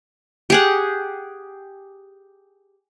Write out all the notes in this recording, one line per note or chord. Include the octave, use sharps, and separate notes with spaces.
G4 G#4 F#5